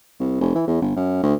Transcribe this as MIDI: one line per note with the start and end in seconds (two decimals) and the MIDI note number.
0.20 0.39 36
0.41 0.52 29
0.55 0.64 52
0.68 0.80 40
0.82 0.94 31
0.96 1.22 42
1.23 1.34 38